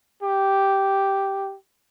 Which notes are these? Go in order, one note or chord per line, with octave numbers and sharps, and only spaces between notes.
G4